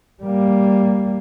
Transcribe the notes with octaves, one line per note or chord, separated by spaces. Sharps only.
G3 A#3